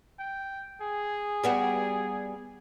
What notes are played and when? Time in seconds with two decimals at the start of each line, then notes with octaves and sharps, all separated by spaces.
0.19 G5
0.81 G#4
1.44 G3 B3 F#4